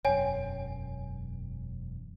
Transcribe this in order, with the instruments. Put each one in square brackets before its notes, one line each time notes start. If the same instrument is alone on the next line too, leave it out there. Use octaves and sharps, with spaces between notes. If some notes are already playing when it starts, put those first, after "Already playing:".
[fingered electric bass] E1 F#2 [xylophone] C#5 G5 G#5